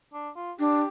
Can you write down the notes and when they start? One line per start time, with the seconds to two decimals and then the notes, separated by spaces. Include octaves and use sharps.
0.13 D4
0.36 F4
0.59 D4 G4